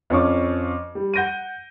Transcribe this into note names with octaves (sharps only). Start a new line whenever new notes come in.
F2 F3 C#4 C#6 D6
G3
F#5 G6 A#6 D7 D#7